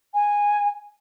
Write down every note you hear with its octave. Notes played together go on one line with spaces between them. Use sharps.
G#5